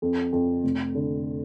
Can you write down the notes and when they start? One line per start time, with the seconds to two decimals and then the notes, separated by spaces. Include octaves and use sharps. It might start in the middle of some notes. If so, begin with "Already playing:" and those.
0.02 F2
0.32 F2
0.64 F1
0.95 D3